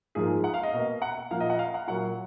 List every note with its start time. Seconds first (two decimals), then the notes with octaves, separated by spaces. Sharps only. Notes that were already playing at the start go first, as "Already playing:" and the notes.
0.15 G#2 F3 A#3 G#4
0.44 F#5
0.54 F5
0.63 D#5
0.73 B2 A#3
1.02 F#5
1.31 A#2 F3 A#3 F5
1.40 D#5
1.50 F#5
1.59 F5
1.74 F#5
1.87 A#2 F#3 A#3 F#5